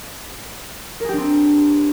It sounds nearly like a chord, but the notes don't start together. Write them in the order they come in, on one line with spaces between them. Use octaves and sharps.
A#4 G#4 G4 D4 C4